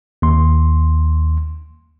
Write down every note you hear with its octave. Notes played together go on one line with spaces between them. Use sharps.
D#2 C6